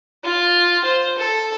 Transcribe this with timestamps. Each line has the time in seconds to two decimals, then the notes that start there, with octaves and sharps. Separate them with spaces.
0.23 F4
0.85 C5
1.18 A4